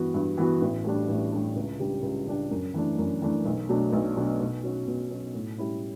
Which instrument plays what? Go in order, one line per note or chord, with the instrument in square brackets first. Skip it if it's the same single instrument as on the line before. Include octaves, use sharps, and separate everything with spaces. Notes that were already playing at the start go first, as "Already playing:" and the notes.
Already playing: [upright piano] G2 E3 B3 F#4
G2
E3 B3 F#4
A1
A2 G3 D4
A1
A2 G3 D4
C#2
C#3 G3 D4 G4
C#2
C#3 G3 D4 G4
F#2
E3 A3 D4
F#2
E3 A3 D4
B1
B2 F#3 A3 D4
B1
B2 F#3 A3 D4
B2
F#3 C#4 F#4
B2
F#3 C#4 F#4
A2
G3 C#4 E4